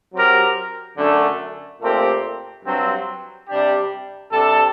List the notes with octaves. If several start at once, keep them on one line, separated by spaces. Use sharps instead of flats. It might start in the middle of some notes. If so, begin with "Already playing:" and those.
F#3 C4 G4 A#4
F#2 D3 A3
A#2 A3 C4 G4 A#4
G2 F#3 C4
C3 G3 D4 G4
C3 G3 D4 A4